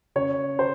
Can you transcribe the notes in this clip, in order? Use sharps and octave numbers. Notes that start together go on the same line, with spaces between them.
C#3 C#5
C5